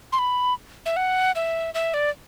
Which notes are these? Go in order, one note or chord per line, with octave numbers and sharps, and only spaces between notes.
C6
B5
E5
F#5
E5
E5
D5